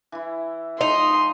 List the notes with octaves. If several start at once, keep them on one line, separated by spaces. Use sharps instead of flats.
E3 E4
F3 G#3 D#4 C6